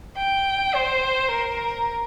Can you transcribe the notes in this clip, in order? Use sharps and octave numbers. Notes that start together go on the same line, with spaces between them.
G5
C5
A#4